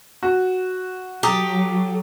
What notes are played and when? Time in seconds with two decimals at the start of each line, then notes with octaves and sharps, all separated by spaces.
0.23 F#4
1.23 F#3 G4 A4 A#5 D#6